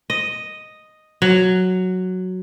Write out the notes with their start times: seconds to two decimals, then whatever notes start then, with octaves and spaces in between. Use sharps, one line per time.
0.10 D#5
1.22 F#3